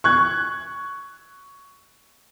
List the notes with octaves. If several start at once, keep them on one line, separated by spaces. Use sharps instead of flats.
C#6 F#6 G#6